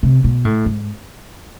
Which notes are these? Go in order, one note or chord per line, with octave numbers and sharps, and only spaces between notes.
C3
B2
A2
G#2